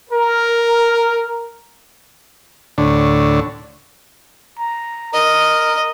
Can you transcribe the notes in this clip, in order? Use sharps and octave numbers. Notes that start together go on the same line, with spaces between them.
A#4
D2 A2 D3 D4 C#5
A#5
A#4 D#5